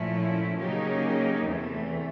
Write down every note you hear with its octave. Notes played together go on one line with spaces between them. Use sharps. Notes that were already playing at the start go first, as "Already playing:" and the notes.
Already playing: A#2 F3 A3 C#4 E4
C#3 F#3 A#3 D#4 G4
E2 C3 E3 A3